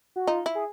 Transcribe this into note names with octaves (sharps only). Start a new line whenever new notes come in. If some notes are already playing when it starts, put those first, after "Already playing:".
F#4
D#4 F4
E4
G#4